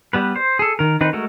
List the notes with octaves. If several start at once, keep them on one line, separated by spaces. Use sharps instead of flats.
G3 B3 B4
C5
G#4 A4
D#3 A#4
D#3 C4 D#4 B4
G#3 A3 F#4 A#4